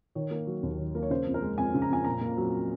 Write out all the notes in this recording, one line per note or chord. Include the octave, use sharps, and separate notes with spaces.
D#3 C#5
A#3
F#3
D#2
D#3
A#3
C#5
C#3 C5
F2
A#4
G#3
F2 G#5
C#3
A#5
F2 G#5
A#2 A#5
A#3
F#3